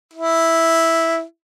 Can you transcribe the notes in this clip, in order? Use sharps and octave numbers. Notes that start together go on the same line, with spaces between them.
E4